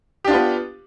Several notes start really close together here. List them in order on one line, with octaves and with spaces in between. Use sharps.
G4 D4 F4 B3